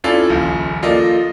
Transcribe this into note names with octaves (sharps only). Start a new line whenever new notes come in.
C4 C#4 E4 F4 A4 D5
D#1 A#1 C#3
F3 A#3 F4 A4 D5 D#5